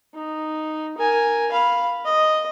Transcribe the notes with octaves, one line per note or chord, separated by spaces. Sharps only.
D#4
A#4 G#5
F5 B5
D#5